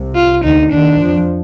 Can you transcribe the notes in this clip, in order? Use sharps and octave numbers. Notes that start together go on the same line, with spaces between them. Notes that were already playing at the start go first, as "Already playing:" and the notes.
Already playing: C2 C3
F4
D2 D3 D#4
D#2 D#3 D4
F2 F3